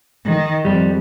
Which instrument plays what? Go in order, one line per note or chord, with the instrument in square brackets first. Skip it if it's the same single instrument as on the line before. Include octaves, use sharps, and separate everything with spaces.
[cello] D#3
[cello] F2 [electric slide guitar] G3